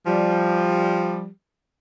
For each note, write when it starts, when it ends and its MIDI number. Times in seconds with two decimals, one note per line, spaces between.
0.06 1.28 53
0.06 1.28 55